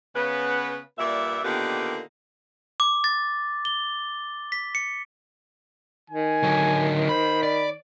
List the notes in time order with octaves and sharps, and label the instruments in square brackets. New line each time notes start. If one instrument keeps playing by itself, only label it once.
[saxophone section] C#3 B3 B4
G2 A#2 D5 E5
A#2 D3 D#3 A#3 B3 G4
[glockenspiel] D6
A6
G7
B6
C#7
[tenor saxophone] D#3 [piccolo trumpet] G#5
[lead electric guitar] D3 F#3
[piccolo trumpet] C5 [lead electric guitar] B5
[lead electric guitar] D5 [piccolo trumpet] B5